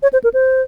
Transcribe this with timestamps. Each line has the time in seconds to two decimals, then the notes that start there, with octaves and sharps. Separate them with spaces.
0.03 C#5
0.13 C5
0.24 A#4
0.34 C5